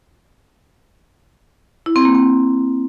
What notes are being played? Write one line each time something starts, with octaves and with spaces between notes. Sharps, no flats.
E4
C4
A#3
C4